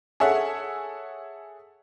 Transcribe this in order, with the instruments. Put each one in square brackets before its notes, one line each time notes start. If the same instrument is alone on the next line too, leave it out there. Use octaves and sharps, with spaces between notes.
[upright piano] G#4 A4 C#5 E5 F#5